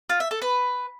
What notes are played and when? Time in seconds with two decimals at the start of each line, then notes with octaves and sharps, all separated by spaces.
0.09 F4
0.20 E5
0.31 A4
0.42 B4